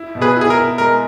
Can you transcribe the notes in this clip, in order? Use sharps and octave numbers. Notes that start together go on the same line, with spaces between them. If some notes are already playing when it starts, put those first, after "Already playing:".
Already playing: E4
B2
G#4 B4
E4
G#4
A#4
E4
G#3 A#4